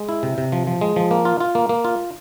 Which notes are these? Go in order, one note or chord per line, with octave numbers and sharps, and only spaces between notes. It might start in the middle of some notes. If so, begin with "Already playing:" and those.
Already playing: G#3
E4
C3
C3
F3
F3
G#3
F3
A#3
F4
F4
A#3
A#3
F4